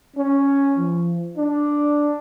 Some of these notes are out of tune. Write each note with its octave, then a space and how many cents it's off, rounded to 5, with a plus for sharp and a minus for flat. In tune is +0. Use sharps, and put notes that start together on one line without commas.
C#4 +0
F3 -30
D4 +0